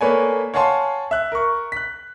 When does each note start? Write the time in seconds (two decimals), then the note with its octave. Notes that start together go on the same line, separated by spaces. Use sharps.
0.01 A3 A#3 B4 C#5 D5 G#5
0.54 C#5 F5 F#5 G#5 A5 C6
1.11 E5 F#6
1.32 A#4 C#6
1.72 F#6 B6